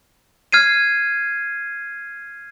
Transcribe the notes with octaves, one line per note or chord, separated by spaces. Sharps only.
F6 G#6 C7 D#7